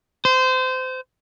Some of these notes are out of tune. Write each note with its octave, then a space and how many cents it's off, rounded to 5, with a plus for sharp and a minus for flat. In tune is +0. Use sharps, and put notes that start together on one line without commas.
C5 -25